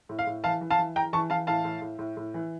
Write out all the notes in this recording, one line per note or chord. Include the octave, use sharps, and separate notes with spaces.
A2
F5
A2
E3 F5 A5
E3
F5 A5
E3
E3 G5 A#5
E3 A5 C#6
E3 F5 A5
A2 F5 A5
A2
A2
A2
A2
E3